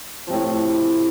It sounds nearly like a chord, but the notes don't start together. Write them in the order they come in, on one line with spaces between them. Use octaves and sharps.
F3 C3 A2